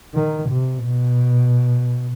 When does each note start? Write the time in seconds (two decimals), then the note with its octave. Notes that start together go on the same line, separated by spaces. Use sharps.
0.14 D#3
0.49 C3
0.85 B2